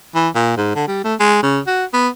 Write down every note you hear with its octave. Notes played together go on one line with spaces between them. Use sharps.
E3
A#2
G#2
D3
G3
A3
G#3
C#3
F#4
B3